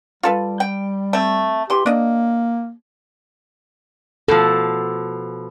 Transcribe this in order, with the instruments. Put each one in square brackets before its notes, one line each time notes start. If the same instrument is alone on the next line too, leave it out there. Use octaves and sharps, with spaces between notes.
[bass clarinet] G3 [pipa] F4 A4 B4
[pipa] G5
A3 C4
[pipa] E3 C6 [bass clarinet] G4
[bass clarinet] A#3 [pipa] D4 D#5
[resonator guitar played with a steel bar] B2 F3 [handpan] A4